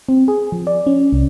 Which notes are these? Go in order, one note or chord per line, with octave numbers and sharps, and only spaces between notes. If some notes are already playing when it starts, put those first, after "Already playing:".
C4
G#4
F3
D5
C#4
C2